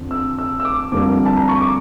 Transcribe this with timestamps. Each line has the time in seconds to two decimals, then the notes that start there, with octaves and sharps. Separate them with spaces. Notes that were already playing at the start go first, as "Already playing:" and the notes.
Already playing: F2 D3
0.11 E6
0.39 E6
0.60 E6
0.65 D6
0.92 F2 D3 G3 A#3 D6
1.26 A5
1.37 A#5
1.48 C#6
1.61 D6